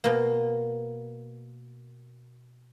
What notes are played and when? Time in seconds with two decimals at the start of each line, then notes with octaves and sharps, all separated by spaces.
0.04 B2 A#3